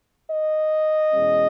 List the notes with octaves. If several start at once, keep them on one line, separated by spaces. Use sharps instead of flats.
D#5
E2 B2 G#3 C#4